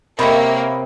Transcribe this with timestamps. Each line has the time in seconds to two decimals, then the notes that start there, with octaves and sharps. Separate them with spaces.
0.19 C3 A#3 A#4 C#5 D#5 E5 G5 B5